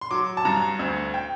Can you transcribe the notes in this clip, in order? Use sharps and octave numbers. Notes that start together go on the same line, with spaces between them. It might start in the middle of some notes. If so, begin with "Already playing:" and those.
C6
F#3 D6
A5
G2 A#5
D2
G5